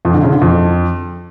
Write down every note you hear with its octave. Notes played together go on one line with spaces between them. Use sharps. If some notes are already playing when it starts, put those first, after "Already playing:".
F2
D3
C#3
D3
F2